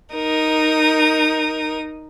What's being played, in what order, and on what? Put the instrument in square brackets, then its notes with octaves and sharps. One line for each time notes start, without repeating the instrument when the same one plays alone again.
[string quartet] D#4 A#4 D#6